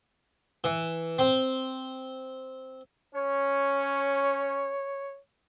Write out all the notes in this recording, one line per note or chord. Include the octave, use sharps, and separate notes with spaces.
E3
C4
C#4 C#5